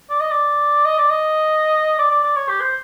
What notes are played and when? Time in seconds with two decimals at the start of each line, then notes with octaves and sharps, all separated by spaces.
0.10 D5
0.20 D#5
0.31 D5
0.85 D#5
0.98 D5
1.10 D#5
1.99 D5
2.11 D5
2.24 D5
2.36 C#5
2.49 G4
2.61 C5